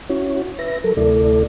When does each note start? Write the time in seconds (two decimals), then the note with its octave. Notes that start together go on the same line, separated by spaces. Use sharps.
0.09 C#4 E4 F#4 C#5
0.59 B4 E5 A#6
0.84 F#3 A4 A#4
0.97 D2 C3 A3 E4 A4 D5